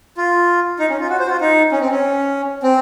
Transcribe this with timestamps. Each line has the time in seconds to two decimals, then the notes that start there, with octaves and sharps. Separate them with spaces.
0.17 F4
0.79 D#4
0.90 C#4
1.00 F4
1.10 F#4
1.19 C5
1.26 F#4
1.30 F4
1.41 D#4
1.72 C#4
1.81 C4
1.91 C#4
2.63 C4